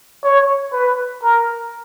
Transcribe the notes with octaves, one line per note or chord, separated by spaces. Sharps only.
C#5
B4
A#4